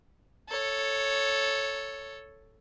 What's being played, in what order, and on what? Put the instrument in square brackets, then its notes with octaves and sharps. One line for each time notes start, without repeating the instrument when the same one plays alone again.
[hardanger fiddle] A4 C#5